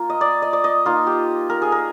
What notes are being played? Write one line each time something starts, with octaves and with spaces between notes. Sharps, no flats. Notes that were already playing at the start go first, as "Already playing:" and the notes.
Already playing: A#3 F4
D#5
D5
D#5
D5
D#5
A#3 D#4 F4
G4
A#4
G#4
A#4